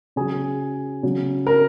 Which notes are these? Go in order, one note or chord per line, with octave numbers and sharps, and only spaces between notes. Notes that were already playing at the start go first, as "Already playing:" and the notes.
C#3 F#3 G#4
C#3 F#3
A#4